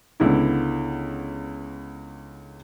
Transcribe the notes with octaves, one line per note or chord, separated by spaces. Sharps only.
C#2 D3 B3 E4